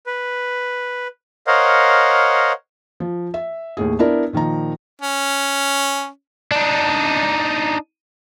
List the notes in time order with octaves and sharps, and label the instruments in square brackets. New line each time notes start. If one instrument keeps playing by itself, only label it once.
[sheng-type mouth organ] B4
A#4 C5 C#5 D#5 F5 F#5
[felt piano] F3
E5
D#2 A2 G#4
B3 D4 E4 A#4 D5
A#2 D#3 F3 A#5
[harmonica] C#4
[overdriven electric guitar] D4 D#4